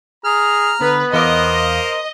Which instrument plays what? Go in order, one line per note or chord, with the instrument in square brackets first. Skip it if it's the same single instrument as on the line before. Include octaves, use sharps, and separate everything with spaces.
[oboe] G#4 [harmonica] A#5 F6
[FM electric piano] D3 [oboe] B3 [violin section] B4
[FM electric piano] E2 F5 D6 [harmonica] A#4 C5 [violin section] D#5